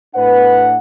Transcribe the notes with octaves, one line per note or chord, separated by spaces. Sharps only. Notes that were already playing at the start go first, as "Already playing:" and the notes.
A2 D4 B4 F#5